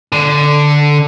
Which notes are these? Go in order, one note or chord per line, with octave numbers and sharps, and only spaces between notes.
D3